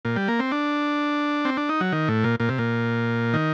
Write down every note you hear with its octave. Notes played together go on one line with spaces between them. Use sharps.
A#2
G3
A#3
C4
D4
C4
D4
D#4
F#3
D#3
A2
A#2
A#2
C3
A#2
D#3